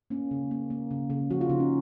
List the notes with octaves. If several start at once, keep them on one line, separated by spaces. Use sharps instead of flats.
A#3 C#4
C#3
A#3
A#3
C#3
C#3
F3 F#4
F4
C#3 D#4
C#4